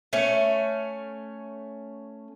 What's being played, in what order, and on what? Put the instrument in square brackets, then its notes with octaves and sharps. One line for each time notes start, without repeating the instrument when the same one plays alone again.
[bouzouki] A3 C#4